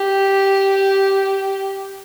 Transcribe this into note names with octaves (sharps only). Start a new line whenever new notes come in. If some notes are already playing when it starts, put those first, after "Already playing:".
Already playing: G4